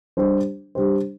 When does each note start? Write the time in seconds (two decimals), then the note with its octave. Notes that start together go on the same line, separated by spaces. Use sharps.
0.17 G3 D4 G4 C5
0.75 G3 D4 G4 C5